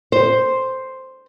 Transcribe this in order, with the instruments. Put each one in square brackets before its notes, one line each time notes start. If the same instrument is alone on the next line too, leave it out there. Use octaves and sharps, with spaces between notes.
[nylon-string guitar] C5